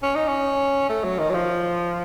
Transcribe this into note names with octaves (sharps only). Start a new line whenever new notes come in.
C#4
D#4
C#4
A3
F#3
D#3
F#3
F3